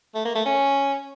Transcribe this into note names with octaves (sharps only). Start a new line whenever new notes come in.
A3
A#3
A3
C#4